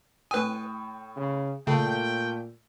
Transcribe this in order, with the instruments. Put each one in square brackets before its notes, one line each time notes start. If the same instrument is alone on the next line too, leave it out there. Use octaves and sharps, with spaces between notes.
[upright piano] A2 G5 D#6 [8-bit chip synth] B4 G#5
[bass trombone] C#3
[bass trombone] A#2 [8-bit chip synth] C#3 [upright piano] A3 [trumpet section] G5